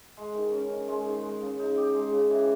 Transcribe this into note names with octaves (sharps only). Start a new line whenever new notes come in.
G#3
D#3
C#4
D#3
G#3
D#3
G#3
C#3
D#4
G4
G#3
C#3
E3